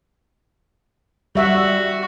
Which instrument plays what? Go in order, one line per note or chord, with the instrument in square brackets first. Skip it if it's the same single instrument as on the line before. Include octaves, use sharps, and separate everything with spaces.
[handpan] G3 E5 F#5 [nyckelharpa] F#4